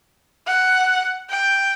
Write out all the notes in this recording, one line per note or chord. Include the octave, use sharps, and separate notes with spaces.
F#5
G5